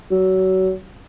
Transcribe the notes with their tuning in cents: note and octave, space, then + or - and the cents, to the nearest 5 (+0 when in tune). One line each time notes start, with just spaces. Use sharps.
F#3 +25